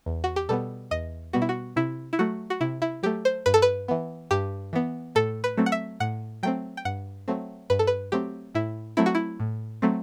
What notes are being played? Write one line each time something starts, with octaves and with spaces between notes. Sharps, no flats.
E2
F#4
G4
B2 G3 B3 A4
E2 D#5
B2 G3 B3 F#4
E4
F#4
C3 E4
E4
F#3 A3 F#4
F#4
C3 E4
E4
F#3 A3 G4
C5
G2 B4
A4
B4
E3 B3
G2 G4
E3 B3
A2 A4
B4
F#3 A3 C4
F#5
E5
A2 F#5
F#3 A3 C4 G5
G5
G2 F#5
F#3 A3 C4
G2 B4
A4
B4
F#3 A3 C4 G4
A2 E4
F#3 A3 C4 E4
F#4
E4
A2
F#3 A3 C4